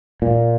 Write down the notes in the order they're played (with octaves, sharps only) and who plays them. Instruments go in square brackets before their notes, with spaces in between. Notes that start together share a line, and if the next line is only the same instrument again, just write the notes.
[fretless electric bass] A#2